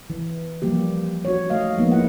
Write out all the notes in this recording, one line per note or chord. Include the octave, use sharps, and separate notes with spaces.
E3
F3 G3 A#3 G4
F#4 C#5
A3 D#5 F5
F3 G#3 A#3 B3 D#4
A#3 E4 F#5